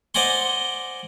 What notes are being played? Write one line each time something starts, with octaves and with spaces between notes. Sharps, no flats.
C5 D5 D#5 F#5 G#5 C6